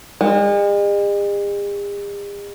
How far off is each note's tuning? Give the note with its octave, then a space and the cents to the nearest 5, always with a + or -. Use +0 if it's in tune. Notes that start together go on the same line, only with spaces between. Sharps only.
G#3 -45